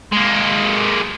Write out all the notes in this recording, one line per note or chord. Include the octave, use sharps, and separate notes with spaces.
G#3 A#3